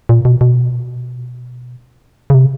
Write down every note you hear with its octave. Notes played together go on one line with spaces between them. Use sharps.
A#2
B2
B2
C#3
C3